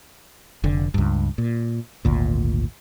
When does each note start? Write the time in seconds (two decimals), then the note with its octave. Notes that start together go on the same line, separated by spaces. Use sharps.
0.64 F1 D3
0.94 C#2 G2
1.38 A#2
2.05 G#1 D2 A#2